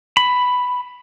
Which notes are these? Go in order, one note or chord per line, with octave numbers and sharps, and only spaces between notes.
B5